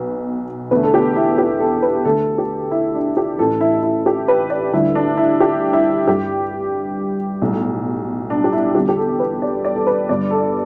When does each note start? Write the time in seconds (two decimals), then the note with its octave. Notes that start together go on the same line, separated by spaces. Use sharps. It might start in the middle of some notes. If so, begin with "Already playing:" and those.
Already playing: B1 B2 B4
0.71 E2 D3 A3 B4
0.83 A4
0.94 G4
1.16 E4
1.38 G4
1.60 A4
1.82 B4
2.05 D2 D3 A3 A4
2.38 G4
2.71 E4
2.95 D4
3.17 G4
3.38 A1 A2 E3 A4
3.61 E4
3.83 E4
4.06 G4
4.28 B4
4.50 D5
4.73 D2 D3 G3 E4
4.95 D4
5.17 E4
5.40 G4
5.73 E4
6.07 G2 G3 G4
7.41 B1 A2 G3
8.30 D4
8.44 G4
8.53 E4
8.75 E2 D3 G3 G4
8.89 G4
8.97 A4
9.20 B4
9.42 D5
9.65 D5
9.76 A4
9.87 B4
10.09 G1 G2 G3 D5
10.31 A4